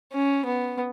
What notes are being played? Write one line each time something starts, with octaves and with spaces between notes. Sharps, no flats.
C#4
B3